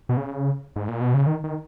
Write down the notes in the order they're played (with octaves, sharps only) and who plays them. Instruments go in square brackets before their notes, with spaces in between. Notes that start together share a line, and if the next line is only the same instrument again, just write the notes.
[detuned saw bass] B2
C#3
G#2
A#2
B2
C#3
D#3
D#3